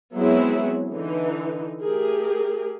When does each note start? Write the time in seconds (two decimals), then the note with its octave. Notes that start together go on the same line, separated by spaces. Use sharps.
0.17 F#3 G#3 B3 C4 E4 G#4
0.94 D3 E3 D#4
1.84 A3 G4 G#4 A#4